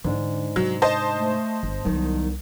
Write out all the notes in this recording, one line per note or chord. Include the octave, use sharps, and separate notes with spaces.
G#2 D3 E3 D4
C3 F#3
C5 D#5 A5
A3
G1
C2 D#3 F#3 B3